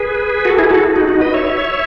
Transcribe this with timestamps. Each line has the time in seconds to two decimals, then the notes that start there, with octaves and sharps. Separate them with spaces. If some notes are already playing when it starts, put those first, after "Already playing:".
Already playing: G#4 B4
0.45 F#4 A4
0.58 E4 G#4
0.70 F#4 A4
0.96 D#4 F#4
1.08 D#4 F#4
1.21 B4 D#5
1.33 C#5 E5